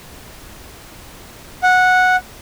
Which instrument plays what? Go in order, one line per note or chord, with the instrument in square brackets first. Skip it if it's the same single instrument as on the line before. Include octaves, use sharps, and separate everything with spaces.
[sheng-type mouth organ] F#5